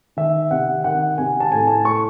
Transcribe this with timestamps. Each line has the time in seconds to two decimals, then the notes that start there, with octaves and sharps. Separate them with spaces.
0.17 D#3 E5
0.51 C3 F#5
0.84 D#3 F#5
1.18 C3 G#5
1.40 A5
1.51 A2 G#5
1.67 A5
1.84 A2 C#6